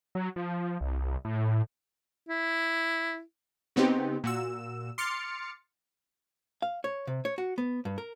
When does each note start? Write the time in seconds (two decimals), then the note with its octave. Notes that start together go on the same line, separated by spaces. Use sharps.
0.15 F#3
0.36 F3
0.81 C2
1.25 A2
2.29 E4
3.76 C#3 B3 C4 D#4 G4
4.24 A#2 F#4 E6
4.98 C6 D6 F6 A6 C#7
6.62 F5
6.84 C#5
7.07 C3
7.25 C#5
7.38 F#4
7.58 B3
7.85 G2
7.98 A#4